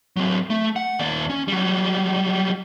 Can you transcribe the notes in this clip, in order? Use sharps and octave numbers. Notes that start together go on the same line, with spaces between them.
F#3 C4
A3
F#5
D#2 D5
C#4
F#3 G3